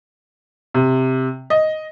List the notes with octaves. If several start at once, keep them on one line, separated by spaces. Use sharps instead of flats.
C3
D#5